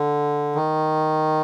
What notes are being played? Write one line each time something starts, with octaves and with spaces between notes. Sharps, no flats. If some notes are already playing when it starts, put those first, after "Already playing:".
Already playing: D3
D#3